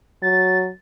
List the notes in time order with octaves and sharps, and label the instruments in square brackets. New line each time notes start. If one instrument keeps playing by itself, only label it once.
[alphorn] F#3 [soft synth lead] A6